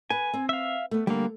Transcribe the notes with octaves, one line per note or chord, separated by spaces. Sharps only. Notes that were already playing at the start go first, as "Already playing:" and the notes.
B4 G#5
C4
E5 F5
A3 B3
D3 G3 A#3